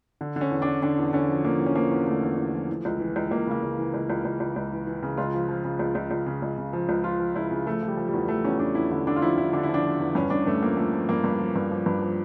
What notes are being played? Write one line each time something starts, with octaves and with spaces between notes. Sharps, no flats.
D3
D3
C#4
E2
E2 D4
D3 D4
E2
D3 C#4
F3
F3 A#3
E2
C#4
F3 A#3
E2
D3 A3
E2
E2
F3
E3
C#2
E3
C#2
C#2 A#3
C#3 A#3
C#2
E3
C#2
C#2
C#2
C#2
C#2
E3
E3
C#3
C#2 F4
F3
F3
C#3
C#2
C#2
C#2
C#3
C#2
C#3
F3
C#2
F3 F4
F3
C#2 E4
C#3
F3 A3
F3 G3
F3
G3
E2
F3 A3
E2 C#4
E2 D4
E2 E4
D3 E4
D3 D4
F4
F3 E4
D3 E4
D3 D4
E4
F3
D4
F3
E2
G2 C#4
G2 D4
G2 A3
F3 A#3
F3 A3
F3
G2 A#3
G2
F3
G2
F3
G2
F3